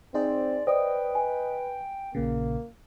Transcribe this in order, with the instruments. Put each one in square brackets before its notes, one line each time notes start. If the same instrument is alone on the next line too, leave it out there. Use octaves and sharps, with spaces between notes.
[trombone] C4 [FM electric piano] D#4 G#4 C5 [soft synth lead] D5
[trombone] B4 [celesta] C5 D5 D#6 [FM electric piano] D#5 [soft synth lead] G5
[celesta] G#5
[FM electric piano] A#1 A#2 C#3 [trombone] A#3